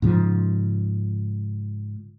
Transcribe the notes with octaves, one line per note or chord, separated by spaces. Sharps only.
G#2 C#3 F3